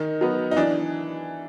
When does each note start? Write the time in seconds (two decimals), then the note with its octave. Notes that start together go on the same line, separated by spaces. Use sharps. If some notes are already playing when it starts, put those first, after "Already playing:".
Already playing: D#3 D#4
0.21 F#3 B3
0.51 D#4
0.56 E3 D4